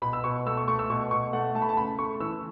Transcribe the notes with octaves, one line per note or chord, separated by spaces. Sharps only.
B2 B5
E6
B2 C#6
A3 E6
C#6
A3 C#6
E6
B2 C#6
B2 C#6
A3 F#5
A3 A5
B5
A5
C#3 B5
A3 C#6
E3 E6